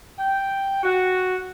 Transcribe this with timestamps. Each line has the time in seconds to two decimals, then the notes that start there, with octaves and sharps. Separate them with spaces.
0.18 G5
0.83 F#4